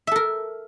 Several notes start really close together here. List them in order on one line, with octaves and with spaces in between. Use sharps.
E5 A4 A#4